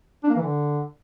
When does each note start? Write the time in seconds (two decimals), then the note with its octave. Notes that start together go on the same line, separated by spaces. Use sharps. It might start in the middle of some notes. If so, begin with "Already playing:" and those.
0.23 D4
0.30 A#3
0.36 E3
0.43 D3